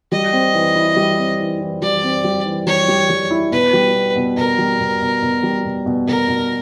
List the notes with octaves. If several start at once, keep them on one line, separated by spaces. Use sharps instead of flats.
G3 D#5
C4
E3
E4
G3
C4
E3
E3
G3 D5
C4
G3
E3
G3 C#5
G3
G3
E4
B2 B4
G3
B3
B2
B2 A#4
G3
B2
B2
B2
G3
B2
B2
B2 A#4
B2